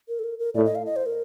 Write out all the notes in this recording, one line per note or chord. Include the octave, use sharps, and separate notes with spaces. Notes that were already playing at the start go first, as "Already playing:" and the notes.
A#4
A4
A#4
A#4
A2 D5
D#5
F5
D#5
C5
A#4